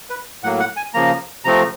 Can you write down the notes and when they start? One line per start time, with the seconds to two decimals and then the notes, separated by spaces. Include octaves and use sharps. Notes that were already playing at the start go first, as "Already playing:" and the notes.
0.10 B4
0.43 A2 F#3 A#3 F#5
0.60 F#5
0.77 G#5
0.94 C#3 F3 A#3 A#5
1.45 C3 F3 A3 C4 A#5